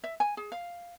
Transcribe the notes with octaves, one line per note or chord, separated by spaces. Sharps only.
E5
G#5
G#4
F5